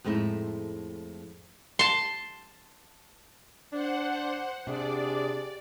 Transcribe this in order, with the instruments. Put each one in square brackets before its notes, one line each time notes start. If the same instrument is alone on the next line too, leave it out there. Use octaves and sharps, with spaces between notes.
[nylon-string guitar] F2 A2 G#3 D#4 E4
[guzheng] A5 C6
[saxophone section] D4 [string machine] C5 F#5
[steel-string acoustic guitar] C3 [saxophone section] D4 G#4 [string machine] D5